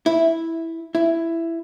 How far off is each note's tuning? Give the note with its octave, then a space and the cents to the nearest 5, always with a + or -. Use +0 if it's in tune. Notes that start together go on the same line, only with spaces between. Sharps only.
E4 -5
E4 +10